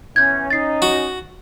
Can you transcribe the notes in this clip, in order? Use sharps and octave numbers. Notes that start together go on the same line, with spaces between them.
E3 B3 C#4 G6 G#6
C#4 D#4 A6 C7
F#4